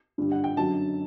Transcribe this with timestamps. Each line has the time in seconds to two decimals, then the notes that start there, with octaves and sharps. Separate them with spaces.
0.18 G2 D3 G3
0.32 F#5
0.44 G5
0.57 F#2 D3 F#3 A5